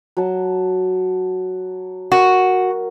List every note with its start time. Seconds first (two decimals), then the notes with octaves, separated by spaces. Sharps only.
0.17 F#3 A5
2.12 F#4 A#4